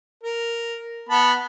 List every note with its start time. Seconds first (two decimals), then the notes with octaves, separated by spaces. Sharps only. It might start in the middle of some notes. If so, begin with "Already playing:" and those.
0.23 A#4
1.09 B3 A5 B5